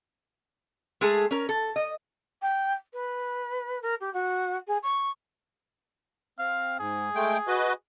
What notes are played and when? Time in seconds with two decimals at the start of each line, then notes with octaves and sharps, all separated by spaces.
1.01 G#3 A3 G#4 A4
1.31 C#4 A#4
1.49 A4
1.76 D#5
2.42 G5
2.93 B4
3.82 A#4
4.01 G4
4.14 F#4
4.68 G#4
4.83 C#6
6.39 C4 F5
6.80 G#2 G#4
7.15 G#3 A3 G5
7.48 F#4 B4 D#5